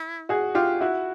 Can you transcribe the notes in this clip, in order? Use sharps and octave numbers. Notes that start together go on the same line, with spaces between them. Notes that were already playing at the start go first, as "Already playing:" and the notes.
Already playing: E4
F#4 G#4
F4 G4
E4 F#4